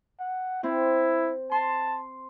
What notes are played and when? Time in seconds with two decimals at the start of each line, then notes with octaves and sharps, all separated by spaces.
0.20 F#5
0.63 C4 E4
1.52 A5 C6